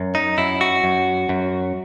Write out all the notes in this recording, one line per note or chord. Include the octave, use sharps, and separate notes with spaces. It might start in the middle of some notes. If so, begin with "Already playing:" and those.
Already playing: F#2
D#4
F#2 E4
F#4
F#2
F#2